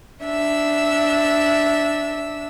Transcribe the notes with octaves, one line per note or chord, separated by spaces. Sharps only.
D4 E5 E6